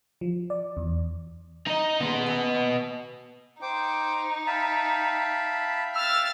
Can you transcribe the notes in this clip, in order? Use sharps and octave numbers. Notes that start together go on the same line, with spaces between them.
F3
D5
E2
D#4 D#5
D#3 A#3 B3 D#5 C6
F#5 G#5 E6
D#4 C5 G5 D6
E5 F5 G5 A5 B5
E6 F6 A6